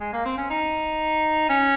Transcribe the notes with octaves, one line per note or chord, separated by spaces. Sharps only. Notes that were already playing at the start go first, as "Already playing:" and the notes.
G#3
A#3
C4
C#4
D#4
C#4